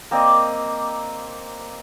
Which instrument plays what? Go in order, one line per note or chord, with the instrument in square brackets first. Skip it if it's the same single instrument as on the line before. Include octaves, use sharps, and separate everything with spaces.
[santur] A#3 C4 D5 D#5